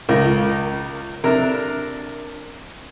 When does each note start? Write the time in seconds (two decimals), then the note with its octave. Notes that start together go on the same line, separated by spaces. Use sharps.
0.09 C#2 A#4
1.24 C3 D4 A#4